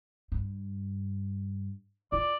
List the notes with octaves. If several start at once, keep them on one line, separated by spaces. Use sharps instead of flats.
G2
F4 D5